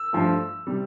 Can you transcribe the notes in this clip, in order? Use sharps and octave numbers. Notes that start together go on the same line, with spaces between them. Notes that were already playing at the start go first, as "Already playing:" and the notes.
Already playing: E6
G2 F3 A3
C3 G3